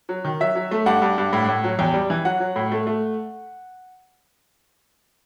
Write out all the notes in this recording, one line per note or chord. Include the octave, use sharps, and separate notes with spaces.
F#3
D#3
F#3 E5
F#3
A3
G2 F#5
G2
G2
A2
A2
F#3
E2 G5
G3
E3
F#3 F#5
F#3
A2
A3
A3